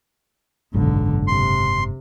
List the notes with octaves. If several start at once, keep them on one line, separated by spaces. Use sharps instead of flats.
F#1 B1 G#2 D3
C3 C6